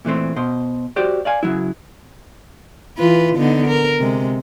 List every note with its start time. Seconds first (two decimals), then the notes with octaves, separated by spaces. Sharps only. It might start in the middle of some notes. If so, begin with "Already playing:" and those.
0.05 A#2 E3 A3 C4
0.36 B2 C5
0.96 F#4 G4 C5 D5
1.25 D5 F5 G#5
1.43 C#3 F3 F#3 E4
2.98 E3 F4 B4
3.37 D3 B3 D#4
3.67 A#4
3.99 C3 G#3